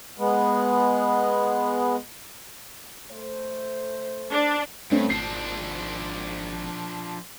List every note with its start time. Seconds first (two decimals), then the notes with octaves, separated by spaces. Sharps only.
0.19 G#3 B3
3.11 A3 C5
4.31 D4
4.91 G2 A3 C4 C#4
5.10 G#1 F3 D4 C7